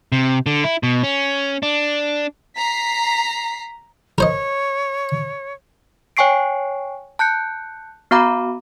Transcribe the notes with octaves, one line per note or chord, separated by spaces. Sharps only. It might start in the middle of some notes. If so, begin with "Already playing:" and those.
C3
D3
E4
B2
C#4
D4
A#5 B6 C7
A#4 C5 C#5 D#5
C#5 G5 G#5 C#6 C7 D7
A5 F#6 G6 C#7
B3 F#4 F5 A#5 B5 D6